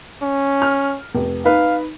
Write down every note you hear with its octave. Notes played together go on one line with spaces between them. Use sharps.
C#4
F6
F1
D#4 B4 F5